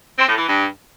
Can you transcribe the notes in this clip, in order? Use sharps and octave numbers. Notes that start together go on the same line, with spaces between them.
C4
A2
E3
G2